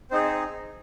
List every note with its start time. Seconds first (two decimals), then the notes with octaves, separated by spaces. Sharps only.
0.11 C4 D#4 G#4 C5
0.25 C5